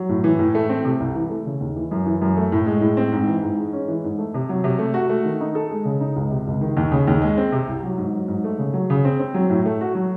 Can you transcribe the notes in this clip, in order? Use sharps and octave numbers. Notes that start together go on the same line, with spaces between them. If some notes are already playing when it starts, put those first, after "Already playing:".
Already playing: F#3
A2
E3
A2
A3
C4
C3
C2
E3
A3
C#3
D#2
E3
F#2
E3
F#2
A3
A2
G#3
A2
C4
G#2
E3
G#2
G#3
C#4
E3
G#2
A3
C3
F#3
C3
A3
F#4
A3
D#3
D#4
A4
G#3
C#3
D#4
C#2
C3
C#2
D#3
D#2
C#3
D#2
G#3
C4
C3
C2
F#3
G#2
F#3
G#2
A3
C#3
F#3
C#3
C4
C4
F#3
A2
A3
F#4
F#3